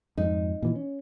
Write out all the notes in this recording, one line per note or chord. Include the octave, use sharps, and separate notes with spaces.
F2 G#2 D#4
A#2 E3
C#4